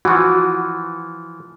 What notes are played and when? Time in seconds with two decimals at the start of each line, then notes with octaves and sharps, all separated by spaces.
0.05 E3 F3 F#4